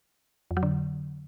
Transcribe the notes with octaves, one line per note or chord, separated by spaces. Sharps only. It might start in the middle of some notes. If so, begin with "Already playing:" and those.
F2
F#3
D3